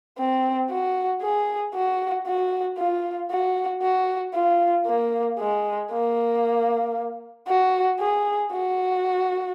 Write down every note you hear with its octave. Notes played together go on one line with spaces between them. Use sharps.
C4
F#4
G#4
F#4
F#4
F4
F#4
F#4
F4
A#3
G#3
A#3
F#4
G#4
F#4